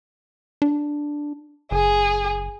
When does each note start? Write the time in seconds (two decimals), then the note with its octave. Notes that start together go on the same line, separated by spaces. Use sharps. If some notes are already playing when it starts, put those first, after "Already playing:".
0.62 D4
1.71 F#1 G#4